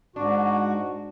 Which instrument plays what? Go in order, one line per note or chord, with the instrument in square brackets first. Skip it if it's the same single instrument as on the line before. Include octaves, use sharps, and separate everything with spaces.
[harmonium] G#2 F#4 [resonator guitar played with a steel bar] D4